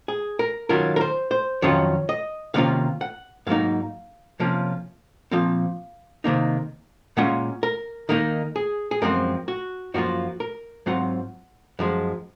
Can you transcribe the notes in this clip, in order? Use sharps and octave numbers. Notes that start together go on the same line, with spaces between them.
G#4
A#4
D#3 F#3 C#4 F4 A#4
A#4
C5
C5
F2 D#3 F#3 C#4 F4 C#5
D#5
C3 D#3 A#3 C#4 F4 F5
F#5
G#2 F#3 A#3 D#4 F5
C3 F3 A#3 C#4 F4
A#2 F3 C4 F5
C3 D#3 A#3 D#4
A#2 G#3 C#4 F4 F#5
A#4
D#3 A#3 D#4 A#4
G#4
G#4
F#2 F3 G#3 C4 A#4
F#4
F#2 F3 A#3 F4 F#4
A#4
G#2 F#3 C4 F4 F#5
F#2 F3 G#3